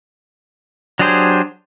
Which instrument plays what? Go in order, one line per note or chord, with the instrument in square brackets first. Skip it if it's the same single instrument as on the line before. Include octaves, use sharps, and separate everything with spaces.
[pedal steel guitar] F#3 D4 G4 G#4 C5